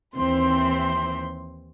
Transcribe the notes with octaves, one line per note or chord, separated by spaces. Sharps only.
D#2 E3 C4 C6